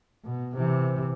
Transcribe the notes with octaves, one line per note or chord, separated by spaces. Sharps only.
B2
C3 E3